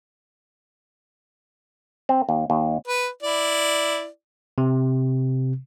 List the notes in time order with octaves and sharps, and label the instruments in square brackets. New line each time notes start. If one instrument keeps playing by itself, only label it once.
[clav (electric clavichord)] C4
D#2
D#2
[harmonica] B4
E4 D5
[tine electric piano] C3